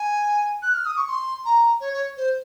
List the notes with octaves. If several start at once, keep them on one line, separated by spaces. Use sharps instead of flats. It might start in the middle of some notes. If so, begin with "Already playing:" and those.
Already playing: G#5
F#6
F6
D#6
C#6
C6
A#5
C#5
C#5
C5